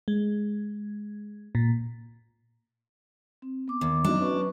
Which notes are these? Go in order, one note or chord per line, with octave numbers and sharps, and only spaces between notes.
G#3
A#2
C4
B3 D6
D#2
F#2 D4 D#4
C#4 B4 C#6